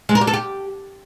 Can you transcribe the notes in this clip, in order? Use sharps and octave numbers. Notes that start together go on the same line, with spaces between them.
G#3
A#4
G4
A4
G4